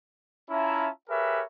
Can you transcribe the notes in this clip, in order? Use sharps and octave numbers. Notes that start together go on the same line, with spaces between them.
C#4 E4 F4 E5 A5 A#5
G4 G#4 A#4 B4 C#5 E5